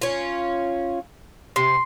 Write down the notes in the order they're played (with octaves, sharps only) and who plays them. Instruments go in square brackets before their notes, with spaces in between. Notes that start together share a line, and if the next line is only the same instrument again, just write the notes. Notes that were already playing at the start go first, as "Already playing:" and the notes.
[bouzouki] C#4 F4
[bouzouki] C3 [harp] C6